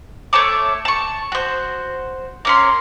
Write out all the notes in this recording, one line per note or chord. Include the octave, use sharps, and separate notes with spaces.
A3 C#5 A5 D6
A5 C#6
F#4 C5
A#3 C#4 C6